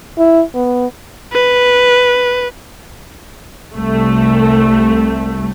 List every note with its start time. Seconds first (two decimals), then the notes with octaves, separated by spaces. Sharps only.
0.18 E4
0.55 B3
1.33 B4
3.75 C2 A3